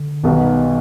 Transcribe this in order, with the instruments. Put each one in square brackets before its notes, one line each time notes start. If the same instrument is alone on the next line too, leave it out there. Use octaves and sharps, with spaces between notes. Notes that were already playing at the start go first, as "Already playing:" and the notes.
Already playing: [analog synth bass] D3
[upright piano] B1 B2 G3 B3 D#4 [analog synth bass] D#3